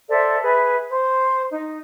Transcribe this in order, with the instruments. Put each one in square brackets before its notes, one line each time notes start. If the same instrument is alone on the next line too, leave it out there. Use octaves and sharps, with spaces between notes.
[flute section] A4 C5 D5 E5
G#4 B4 E5
C5
D#4